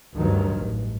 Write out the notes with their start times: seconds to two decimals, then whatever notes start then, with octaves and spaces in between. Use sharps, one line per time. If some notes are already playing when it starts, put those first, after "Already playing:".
0.14 D2 G2 D#3 F#3
0.55 A1